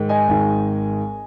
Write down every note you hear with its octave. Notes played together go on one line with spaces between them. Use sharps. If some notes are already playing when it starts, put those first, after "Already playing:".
Already playing: G#2 D#3 G#3
D#5 G#5
G#1 G#2 D#3 G#3